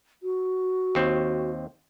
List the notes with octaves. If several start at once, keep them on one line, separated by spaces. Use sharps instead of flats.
F#4
D#2 C4